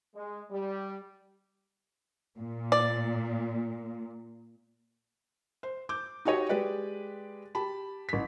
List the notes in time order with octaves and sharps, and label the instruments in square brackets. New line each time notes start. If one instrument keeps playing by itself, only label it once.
[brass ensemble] G#3
G3
[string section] A#2
[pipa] D5
[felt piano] C5
D6 G6
D#4 F#4 G4 C#5 D#5
G#3 G4 B4 D5
G4 A5 B5
A1 B6